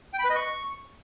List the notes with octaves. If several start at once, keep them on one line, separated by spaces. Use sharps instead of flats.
G5
B5
B4
D#5
C#6